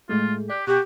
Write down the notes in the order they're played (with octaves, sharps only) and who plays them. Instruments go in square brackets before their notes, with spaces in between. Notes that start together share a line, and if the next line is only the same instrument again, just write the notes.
[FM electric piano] A2 G#3 A3 [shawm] F4
[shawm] G4 [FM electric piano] D5 F#6 B6
[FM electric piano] B2 [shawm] F#4 [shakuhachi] G4